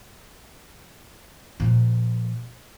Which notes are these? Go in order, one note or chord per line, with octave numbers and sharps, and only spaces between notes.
A#2 F3